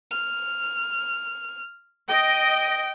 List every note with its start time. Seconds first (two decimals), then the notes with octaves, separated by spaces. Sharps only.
0.11 F6
2.09 D#5 G5 D7